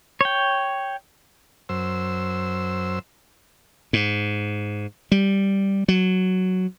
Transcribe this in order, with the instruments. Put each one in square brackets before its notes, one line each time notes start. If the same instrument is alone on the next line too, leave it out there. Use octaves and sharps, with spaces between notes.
[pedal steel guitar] C#5 G5
[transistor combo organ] F#2 C5 E6
[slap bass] G#2
G3
F#3